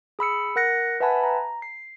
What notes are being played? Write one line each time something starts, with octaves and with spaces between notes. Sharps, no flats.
G#4 B5 E6 C#7
A#4 F#5 F#6 A#6 C#7
B4 E5 F#5 G#5 A5 B5
A#5
C7